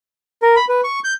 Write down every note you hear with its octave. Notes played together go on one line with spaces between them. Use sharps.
A#4
B5
B4
C#6
G6